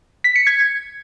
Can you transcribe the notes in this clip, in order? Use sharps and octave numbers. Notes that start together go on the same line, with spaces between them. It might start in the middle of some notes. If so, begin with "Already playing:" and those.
B6
C#7
G#6